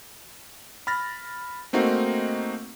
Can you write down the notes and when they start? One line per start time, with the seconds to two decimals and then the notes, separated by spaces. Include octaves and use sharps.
0.87 B5 F6 A6 A#6
1.73 A3 A#3 C4 D#4 F#4